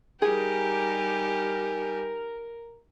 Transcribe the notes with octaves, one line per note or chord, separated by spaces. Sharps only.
G3 D#4 G4 G#4 A#4 G#5